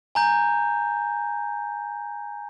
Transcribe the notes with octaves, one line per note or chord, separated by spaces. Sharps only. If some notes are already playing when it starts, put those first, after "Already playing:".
G#5 A#5 G6